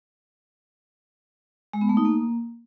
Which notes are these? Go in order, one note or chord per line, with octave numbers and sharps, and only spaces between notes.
G#3
B3
A3
D#4
A#3